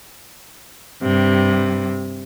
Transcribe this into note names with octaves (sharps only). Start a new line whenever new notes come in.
G2 C3